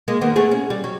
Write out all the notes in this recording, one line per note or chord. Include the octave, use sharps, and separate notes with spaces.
G#3 A#3
D#3 A#3 B3
A3 B3 G#4
C#4
G3
F#3